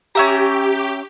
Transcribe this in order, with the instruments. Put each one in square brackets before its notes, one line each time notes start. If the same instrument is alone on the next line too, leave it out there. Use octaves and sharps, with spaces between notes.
[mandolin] C#4 E5 A#5 [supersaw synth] G4